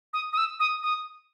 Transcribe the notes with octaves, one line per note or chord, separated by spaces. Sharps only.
D#6
D#6
E6
D#6
D#6